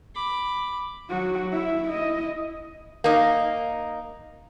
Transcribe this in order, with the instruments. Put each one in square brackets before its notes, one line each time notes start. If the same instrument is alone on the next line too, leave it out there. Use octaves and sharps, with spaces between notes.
[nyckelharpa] B5 D6
[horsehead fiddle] F#3 F#4
E4 E5
E4 D#5
[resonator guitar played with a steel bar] A#3 D#4